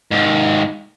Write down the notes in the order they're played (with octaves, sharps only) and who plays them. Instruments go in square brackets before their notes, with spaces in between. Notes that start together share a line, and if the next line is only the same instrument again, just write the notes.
[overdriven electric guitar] D#2 G#2